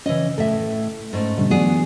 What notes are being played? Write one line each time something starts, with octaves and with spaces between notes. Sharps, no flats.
C#3 E3 C#4 D#5
A2 A4 E5
G#2 A3 C#4
B2 D3 G3
E3 F#3 B3 D4 G#4